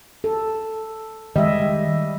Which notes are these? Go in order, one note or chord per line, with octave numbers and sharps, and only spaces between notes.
A4
D#3 G3 G#3 D#5 E5